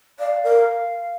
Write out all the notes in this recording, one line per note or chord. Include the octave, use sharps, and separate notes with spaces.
D5 F5
A#4